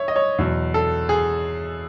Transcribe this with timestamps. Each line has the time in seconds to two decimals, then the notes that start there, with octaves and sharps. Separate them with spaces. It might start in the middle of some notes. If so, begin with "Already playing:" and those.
Already playing: C#5 E5
0.08 D#5
0.16 C#5
0.38 E2 B2 F#3
0.74 A4
1.09 G#4